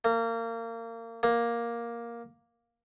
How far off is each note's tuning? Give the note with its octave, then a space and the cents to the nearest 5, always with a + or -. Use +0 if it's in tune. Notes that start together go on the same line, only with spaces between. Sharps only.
A#3 -25
A#3 +10